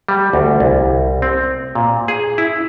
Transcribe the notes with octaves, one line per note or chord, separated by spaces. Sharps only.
G3
D2
C2
C4
A#2
G#4
E4